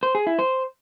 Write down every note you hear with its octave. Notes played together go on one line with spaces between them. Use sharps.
C5
G#4
E4
C5